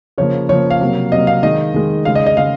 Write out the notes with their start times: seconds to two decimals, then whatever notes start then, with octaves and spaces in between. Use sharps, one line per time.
0.18 C#3 F3 A#3 C#5
0.49 C#3 F3 A#3 C#5
0.70 F5
0.81 C3 F#3 A#3
1.12 C3 F#3 A#3 D#5
1.27 F5
1.43 D#3 G#3 D#5
1.74 D#3 G#3
2.05 C#3 G#3 F5
2.15 D#5
2.26 D#5
2.37 C#3 G#3 F5